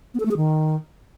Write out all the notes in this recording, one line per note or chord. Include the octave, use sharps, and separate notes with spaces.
B3
A4
A3
G#4
D#3